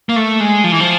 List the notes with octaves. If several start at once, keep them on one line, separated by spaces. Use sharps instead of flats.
A#3
A3
G#3
F3
E3
F3